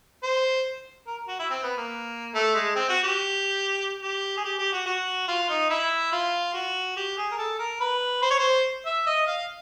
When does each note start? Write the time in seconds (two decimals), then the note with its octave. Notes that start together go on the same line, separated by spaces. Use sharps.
0.23 C5
1.07 A#4
1.28 F#4
1.39 E4
1.50 C4
1.63 B3
1.77 A#3
2.34 A3
2.55 G#3
2.76 C4
2.89 F#4
3.03 G4
4.02 G4
4.37 G#4
4.44 G4
4.58 G4
4.72 F#4
4.86 F#4
5.28 F4
5.49 D#4
5.70 E4
6.12 F4
6.54 F#4
6.97 G4
7.17 G#4
7.31 A#4
7.38 A4
7.59 A#4
7.80 B4
8.22 C5
8.30 C#5
8.39 C5
8.85 E5
9.07 D#5
9.27 F5